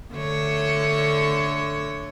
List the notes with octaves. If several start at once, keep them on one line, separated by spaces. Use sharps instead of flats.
D3 A3 C#5